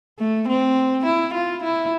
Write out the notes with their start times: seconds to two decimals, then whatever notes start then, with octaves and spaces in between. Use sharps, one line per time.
0.19 A3
0.48 C4
1.05 E4
1.34 F4
1.63 E4